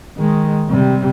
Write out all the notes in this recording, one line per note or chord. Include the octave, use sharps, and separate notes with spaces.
D#3 G#3
C3 G3